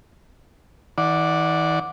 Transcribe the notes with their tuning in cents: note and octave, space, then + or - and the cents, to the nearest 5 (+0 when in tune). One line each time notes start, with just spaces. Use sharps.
E3 -45 D5 +0 F#5 -15